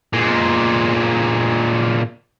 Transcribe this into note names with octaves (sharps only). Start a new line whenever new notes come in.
A#2 G#3